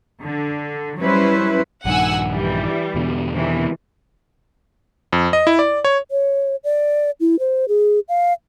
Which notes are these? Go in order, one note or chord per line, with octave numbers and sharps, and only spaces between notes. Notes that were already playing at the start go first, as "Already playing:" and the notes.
D3
F#3 G3 C#4 E4 B4 C5
A#1 G2 D#3 F#5 G#5 E6
E3 G3
E2 B2 D3
C3 D#3 E3
F2
D#5
E4
D5
C#5
C#5
D5
E4
C5
G#4
F5